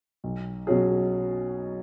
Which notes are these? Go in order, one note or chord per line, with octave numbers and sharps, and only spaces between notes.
B1
B2 F#3 C#4 G#4